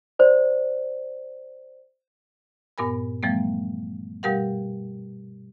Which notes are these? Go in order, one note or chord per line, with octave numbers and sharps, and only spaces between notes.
C5 D5
G2 A#2 B3 A#4 G#5 B5
E3 F3 G3 A3 B3
B2 G3 G4 A#4 F5 F#5